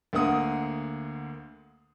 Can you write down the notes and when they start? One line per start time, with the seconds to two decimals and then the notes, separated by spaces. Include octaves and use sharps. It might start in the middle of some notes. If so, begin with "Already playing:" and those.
0.13 D2 D3 A#3 F#5 D#6